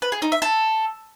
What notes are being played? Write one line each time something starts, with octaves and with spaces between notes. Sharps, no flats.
B4
G#4
D#4
E5
A4